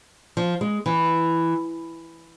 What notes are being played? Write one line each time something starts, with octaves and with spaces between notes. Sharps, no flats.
F3
G#3
E3